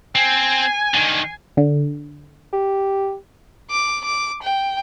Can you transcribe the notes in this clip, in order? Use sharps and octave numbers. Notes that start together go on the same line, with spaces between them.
C4 G#5
D3 D#3
D3
G4
D6
D6
G5